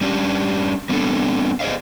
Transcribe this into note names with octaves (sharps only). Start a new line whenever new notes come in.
G3 C#4 D4 G4
G3 B3 C4 D4 A4
G#4 C5 D5 D#5 F5